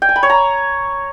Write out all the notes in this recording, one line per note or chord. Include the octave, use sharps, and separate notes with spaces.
G5
G#5
B5
C#5
A#5